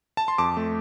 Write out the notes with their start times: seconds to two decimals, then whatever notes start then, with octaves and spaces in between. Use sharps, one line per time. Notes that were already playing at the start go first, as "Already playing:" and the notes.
0.17 A5
0.28 C6
0.38 F2 A5 D6
0.57 A3